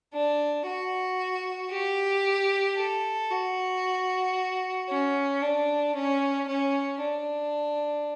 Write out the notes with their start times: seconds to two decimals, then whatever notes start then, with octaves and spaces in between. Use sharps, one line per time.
0.13 D4
0.66 F#4
1.72 G4
2.77 A4
3.31 F#4
4.89 C#4
5.42 D4
5.95 C#4
6.48 C#4
7.01 D4